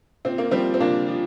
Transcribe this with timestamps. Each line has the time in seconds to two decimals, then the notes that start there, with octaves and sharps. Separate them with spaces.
0.25 A#2 C4
0.38 A#3
0.51 F3 G3 C4
0.74 C4
0.80 A#2 A#3 D4
1.08 F3